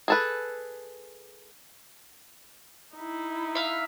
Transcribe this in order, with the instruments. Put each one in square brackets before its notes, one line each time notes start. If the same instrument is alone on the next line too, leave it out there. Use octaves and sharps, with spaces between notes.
[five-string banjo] G#4 A4 B4
[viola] D#4 E4
[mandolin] E5 F5